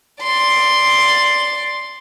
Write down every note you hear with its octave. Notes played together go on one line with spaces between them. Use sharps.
D5 C6